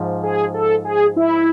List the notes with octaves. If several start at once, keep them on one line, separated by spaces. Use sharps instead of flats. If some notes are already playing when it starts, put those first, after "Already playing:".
Already playing: G#2 F3
G#4
A4
G#4
E4